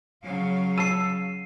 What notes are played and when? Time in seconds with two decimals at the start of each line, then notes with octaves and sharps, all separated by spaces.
0.22 C#3 F#3 F5
0.78 A5 E6 C7 D#7